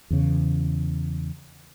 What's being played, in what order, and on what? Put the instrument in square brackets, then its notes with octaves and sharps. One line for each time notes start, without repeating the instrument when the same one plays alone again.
[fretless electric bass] E2 C#3